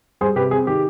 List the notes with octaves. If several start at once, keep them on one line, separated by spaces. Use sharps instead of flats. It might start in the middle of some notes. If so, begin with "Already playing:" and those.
G3 G#4 C5
C3 G4 B4
C4 G#4
D#3 G4